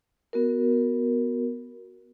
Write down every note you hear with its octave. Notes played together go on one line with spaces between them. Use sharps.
B3 F#4 A#4